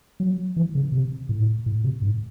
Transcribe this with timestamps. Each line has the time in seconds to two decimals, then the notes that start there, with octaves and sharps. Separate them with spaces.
0.20 F#3
0.56 E3
0.75 C#3
0.92 C3
1.29 A2
1.66 A2
1.84 C3
2.02 G#2